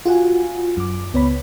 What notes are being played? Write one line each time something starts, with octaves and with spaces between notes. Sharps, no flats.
F4 F#4 F#5 G#5
F#2 D6
C#2 B3 C#5 B5